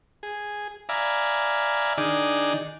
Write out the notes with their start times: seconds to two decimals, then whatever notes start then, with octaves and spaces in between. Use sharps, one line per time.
0.23 G#4
0.89 D5 E5 F5 G#5 A#5 B5
1.98 D#3 D4 D#4 G#4 D5